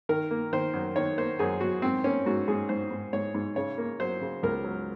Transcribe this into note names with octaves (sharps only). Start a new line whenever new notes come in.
D#3 A#4
A#3
D#3 C5
F#2
D#3 C#5
A#3 C5
F#2 G#4
F#2 F#4
G#2 C4
A#3 C#4
G#2 F#4
G#2 G#4
G#2 C5
G#2
G#2 C#5
G#2
C#3 C#5
A#3
F#3 C5
C#3
C#2 A#4
F#3